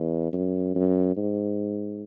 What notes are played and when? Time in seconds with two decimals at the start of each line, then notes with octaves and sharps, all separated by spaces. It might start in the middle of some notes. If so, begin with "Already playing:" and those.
Already playing: E2
0.33 F#2
0.75 F#2
1.17 G#2